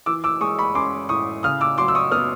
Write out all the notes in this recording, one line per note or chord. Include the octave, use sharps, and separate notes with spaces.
E3 D6 E6
D6 E6
G#3 C#6 D#6
B5 C#6
C#4 C6 D6
A2 C#6 D#6
C#3 D#6 F6
D6 E6
F#3 C6 D6
E6
C#6 D#6
B3 D#6 F6